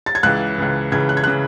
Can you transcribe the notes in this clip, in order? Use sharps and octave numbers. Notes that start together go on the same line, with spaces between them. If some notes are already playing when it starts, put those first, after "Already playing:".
A6
G#6
C#2 C#3 E3 F#6
C#2 C#3 E3
C#2 C#3 E3 G#6
F#6
G#6
C#3 E3 F#6